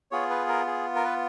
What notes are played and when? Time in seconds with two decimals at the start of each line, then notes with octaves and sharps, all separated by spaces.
0.11 B3 F4 G#4 C#5
0.30 B4
0.48 A#4
0.67 G#4
0.95 A#4
1.05 B4